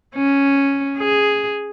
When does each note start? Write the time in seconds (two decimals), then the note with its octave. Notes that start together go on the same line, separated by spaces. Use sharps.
0.15 C#4
0.98 G#4